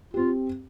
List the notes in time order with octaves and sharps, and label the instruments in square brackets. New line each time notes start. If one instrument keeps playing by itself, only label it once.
[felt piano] C4 G4 [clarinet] F4